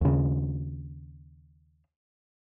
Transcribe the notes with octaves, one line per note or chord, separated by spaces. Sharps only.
D#2 C#3